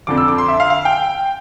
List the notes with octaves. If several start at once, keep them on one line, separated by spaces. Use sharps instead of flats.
F2 D3 F3 D6
E6
D6
C6
E5
F5
F5
G5